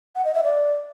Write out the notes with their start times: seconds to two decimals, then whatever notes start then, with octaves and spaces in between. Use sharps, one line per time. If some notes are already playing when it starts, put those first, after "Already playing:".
0.15 F#5
0.25 D#5
0.34 E5
0.44 D5